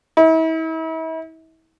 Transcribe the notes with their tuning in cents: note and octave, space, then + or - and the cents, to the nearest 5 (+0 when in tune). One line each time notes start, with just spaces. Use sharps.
E4 -40